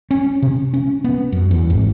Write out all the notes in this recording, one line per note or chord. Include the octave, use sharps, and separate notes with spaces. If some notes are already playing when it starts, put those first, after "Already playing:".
C#4
C3
C#4
B3
F#2
E2
G#1